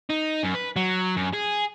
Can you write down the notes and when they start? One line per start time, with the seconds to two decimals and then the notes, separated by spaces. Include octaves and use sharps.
0.10 D#4
0.44 F#2
0.55 B4
0.76 F#3
1.16 F#2
1.33 G#4